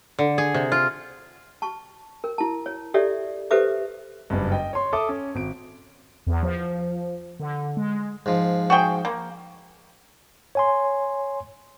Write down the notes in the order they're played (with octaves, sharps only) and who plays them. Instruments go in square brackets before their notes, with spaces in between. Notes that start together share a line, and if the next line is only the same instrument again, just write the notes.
[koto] D3
G#4
C3
F4
[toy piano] A5 C#6
A#4
E4 A5
C#5
G4 A4 C#5 D5 E5
G4 A4 B4 C5 E5 D6
[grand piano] F#1 G2
D#5 G5
C#5 C6
A4 E5 A5 D6 D#6
C#4
G#1 D7
[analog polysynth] E2
F3
D3
G#3
[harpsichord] G#2 F3
[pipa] F#4 G#4 G5
A#3
[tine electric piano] C#5 G#5 C6